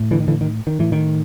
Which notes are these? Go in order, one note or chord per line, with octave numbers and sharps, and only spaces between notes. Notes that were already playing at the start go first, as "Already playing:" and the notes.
Already playing: A2
D3 E3
D#3
D3 E3
D#3
D#3
A2 E3
D#3